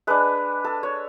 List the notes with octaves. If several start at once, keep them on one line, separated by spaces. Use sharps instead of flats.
G#3 D4 B4
A4
C#5